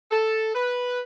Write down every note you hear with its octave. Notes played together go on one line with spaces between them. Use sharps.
A4
B4